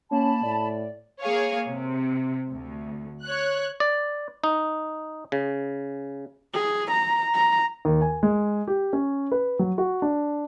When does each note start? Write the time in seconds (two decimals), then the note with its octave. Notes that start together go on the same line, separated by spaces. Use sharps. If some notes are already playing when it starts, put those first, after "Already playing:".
0.11 A#3 C#4 A5 B5
0.43 A2 D5
1.22 A#3 G#4 C#5 F5
1.68 C3
2.52 D2
3.22 C#5 F#6
3.80 D5
4.44 D#4
5.32 C#3
6.54 G#4
6.91 A#5
7.35 A#5
7.85 D#2
8.02 G#5
8.23 G#3
8.68 G4
8.93 C#4
9.32 B4
9.59 F#3
9.78 F#4
10.02 D4